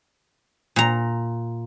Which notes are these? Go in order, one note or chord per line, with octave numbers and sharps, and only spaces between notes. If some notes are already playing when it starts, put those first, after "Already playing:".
A#2 A#5